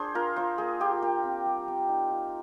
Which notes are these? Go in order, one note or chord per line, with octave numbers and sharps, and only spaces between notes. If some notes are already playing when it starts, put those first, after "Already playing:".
Already playing: D4 G#4 C5
F4 A#4
F4 C5
A#3 G#4
F4 G4
A#3 G4
C4
G3
C4
D#4
F4